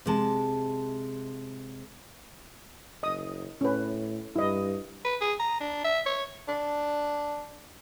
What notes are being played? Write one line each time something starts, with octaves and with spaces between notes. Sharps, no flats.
C3 G#3 A5
F#1 D#5 D#6
A2 C#4 B4
G2 E4 D#5
B4
G#4
A#5
D4
E5
C#5
D4